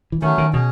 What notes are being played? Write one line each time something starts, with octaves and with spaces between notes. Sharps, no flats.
E3
D#3 F#3 A3 C#4
D#3
B2 C#4 G#4